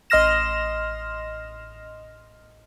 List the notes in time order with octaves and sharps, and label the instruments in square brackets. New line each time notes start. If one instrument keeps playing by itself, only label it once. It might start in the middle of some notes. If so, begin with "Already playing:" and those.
[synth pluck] A1 D#5 C6 F6 A#6 E7